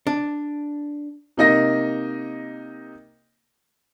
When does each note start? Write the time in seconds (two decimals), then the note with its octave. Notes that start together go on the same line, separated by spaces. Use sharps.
0.07 D4
1.37 C3 A#3 D#4 D#5 A#6